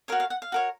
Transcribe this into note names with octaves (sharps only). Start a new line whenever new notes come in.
F#4 A#4 C#5 F5
F5
F#5
F5
F#4 A#4 C#5